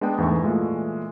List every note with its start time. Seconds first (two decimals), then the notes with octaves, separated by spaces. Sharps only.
0.01 G#3 B3 D4 B4 D#5 G5
0.18 E2 G#2 E3 A3 C#6
0.44 A#2 E3 G#3 A3